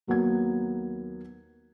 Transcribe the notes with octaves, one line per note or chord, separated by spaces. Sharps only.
D#2 F#3 A#3 B3 G#6